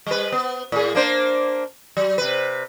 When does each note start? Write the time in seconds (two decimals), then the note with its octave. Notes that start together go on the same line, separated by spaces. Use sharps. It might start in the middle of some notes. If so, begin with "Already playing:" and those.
0.07 G3 B4
0.32 B3
0.72 A2 G#4
0.95 A#3 D4 C5
1.97 F#3
2.18 C3 B4